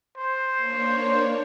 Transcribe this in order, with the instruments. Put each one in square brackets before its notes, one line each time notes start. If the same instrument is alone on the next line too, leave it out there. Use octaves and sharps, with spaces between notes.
[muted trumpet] C5
[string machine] A#3 D4 C#5